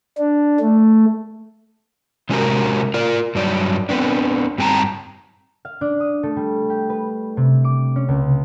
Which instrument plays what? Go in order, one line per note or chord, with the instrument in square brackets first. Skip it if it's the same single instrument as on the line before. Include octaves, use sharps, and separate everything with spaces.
[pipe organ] D4
A3
[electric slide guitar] C3 G#3 C#4 F#4 G4 A#4
F4 A#4 D5
G2 F#3 D5
B3 C4 D4
G2 C4 G5 A5 A#5
[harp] F5
D4
D#6
A3
G3
G4
B4
C3
D6
C#4
C#2